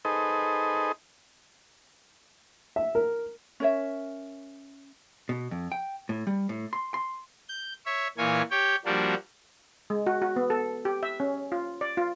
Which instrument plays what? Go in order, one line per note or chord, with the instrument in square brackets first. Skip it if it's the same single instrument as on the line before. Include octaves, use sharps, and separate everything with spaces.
[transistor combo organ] D#4 G#4 A4 B4 C5 D#5
[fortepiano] E5
A#4
[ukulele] C#4 A#4 C#5 E5
[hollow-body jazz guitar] B2
F2
G5
A2
G3
A2
C6
C6
[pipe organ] G6
C#5 E5
A#2 E3 A#3 C#5 G#5
G4 C#5 G5
F3 G3 A#3 D4 F#4
[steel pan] G#3
F#4
F#4
B3
A4
G4
E5
C#4
F4
D5
F4